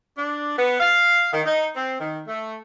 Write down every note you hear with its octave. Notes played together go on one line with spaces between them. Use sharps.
D4
B3
F5
D#3
D#4
C4
D#3
A3